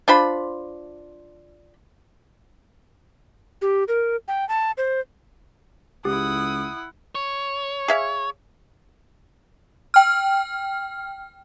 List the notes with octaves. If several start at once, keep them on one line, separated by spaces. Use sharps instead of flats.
D4 F4 C5 B5
G4
A#4
G5
A5
C5
C#2 E4 G4 F#5 D#6
C#5
G#4 E5 F5
G5 F6